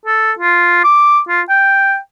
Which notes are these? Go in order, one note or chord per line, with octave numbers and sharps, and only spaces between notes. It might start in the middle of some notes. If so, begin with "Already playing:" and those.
A4
F4
D6
F4
G5